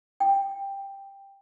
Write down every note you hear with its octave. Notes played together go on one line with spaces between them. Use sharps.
G5